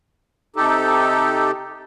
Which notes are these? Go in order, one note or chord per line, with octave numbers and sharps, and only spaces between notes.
C3 D#4 G4 A4